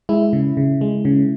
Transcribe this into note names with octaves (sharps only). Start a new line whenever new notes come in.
G#3 E4
C#3
C#3
G#3
C#3